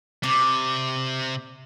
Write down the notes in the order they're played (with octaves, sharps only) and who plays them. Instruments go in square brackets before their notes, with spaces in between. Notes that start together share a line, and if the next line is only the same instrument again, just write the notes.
[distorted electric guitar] C3 [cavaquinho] D5